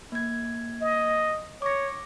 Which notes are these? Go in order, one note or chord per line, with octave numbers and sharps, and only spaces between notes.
A#3 G#6
D#5
C#5 D6 A#6